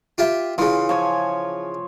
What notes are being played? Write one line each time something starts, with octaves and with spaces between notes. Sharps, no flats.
F4 G4 E5
C#3 E3 F4
F3 C#5 G#5